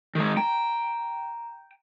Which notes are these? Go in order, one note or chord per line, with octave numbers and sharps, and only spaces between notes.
D#3 G#3
G5 A#5